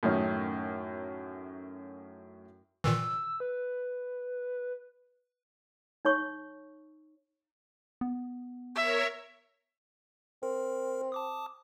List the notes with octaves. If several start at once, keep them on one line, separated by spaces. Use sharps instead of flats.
F#2 A2 D#3 C#4
A#2 D#3 E3 E6
B4
D#4 C#5 C#6
B3
A#4 C#5 E5
C4 A#4
A5 D6 D#6